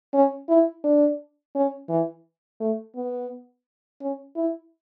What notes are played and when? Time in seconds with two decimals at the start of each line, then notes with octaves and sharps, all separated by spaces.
0.14 C#4
0.49 E4
0.84 D4
1.55 C#4
1.89 E3
2.60 A3
2.95 B3
4.01 C#4
4.36 E4